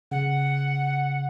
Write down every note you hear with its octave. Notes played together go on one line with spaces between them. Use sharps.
C#3 F#5